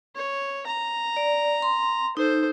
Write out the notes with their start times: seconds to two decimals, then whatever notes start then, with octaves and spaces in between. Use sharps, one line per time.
0.15 C#5
0.67 A#5
1.17 D5
1.62 C6
2.17 D#4 A4 C5